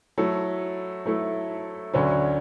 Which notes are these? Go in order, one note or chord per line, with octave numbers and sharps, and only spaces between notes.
F#3 A3 E4 A4
F#3 A3 E4 A4
D2 D3 F#3 C#4